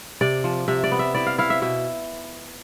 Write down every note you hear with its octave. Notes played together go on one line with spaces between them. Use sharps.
C3 D5
F3
C3 E5
D5
B3
E5
E4 D5
F5
E4 F5
E5
B2 E5